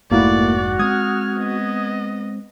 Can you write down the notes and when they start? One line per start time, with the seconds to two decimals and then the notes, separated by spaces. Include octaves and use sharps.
0.11 F1 G#2 A3 A#3 E4 F#4 D5
0.79 G#3 A#3 C4 D#6 F6 G#6
1.36 B3 D#5